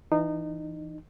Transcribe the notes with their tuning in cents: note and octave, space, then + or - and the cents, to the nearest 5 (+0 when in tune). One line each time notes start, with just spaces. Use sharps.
E3 +0 D#4 -25